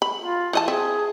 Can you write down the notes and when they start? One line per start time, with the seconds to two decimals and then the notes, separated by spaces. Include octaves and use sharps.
0.02 B5
0.20 F4
0.53 E3 D#5 A5
0.68 C4 G#4 E5